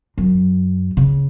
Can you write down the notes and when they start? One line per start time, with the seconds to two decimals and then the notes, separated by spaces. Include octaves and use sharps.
0.18 F#2
0.97 C#3